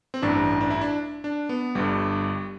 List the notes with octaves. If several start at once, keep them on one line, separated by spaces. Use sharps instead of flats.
C4
A1 G2 E3 D4
D4
E4
D4
D4
B3
G1 G2 D3 G3